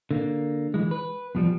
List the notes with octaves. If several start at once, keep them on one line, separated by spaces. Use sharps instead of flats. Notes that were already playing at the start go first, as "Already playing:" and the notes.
D3 A#3
E3 G#3
B4
E2 F3 G3